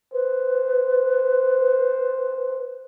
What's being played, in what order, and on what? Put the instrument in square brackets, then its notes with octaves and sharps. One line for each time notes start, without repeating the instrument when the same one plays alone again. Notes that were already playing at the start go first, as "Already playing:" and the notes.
[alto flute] B4 [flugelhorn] C5